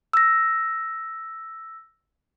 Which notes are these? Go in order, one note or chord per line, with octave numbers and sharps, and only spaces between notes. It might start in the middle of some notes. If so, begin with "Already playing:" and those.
E6 A#6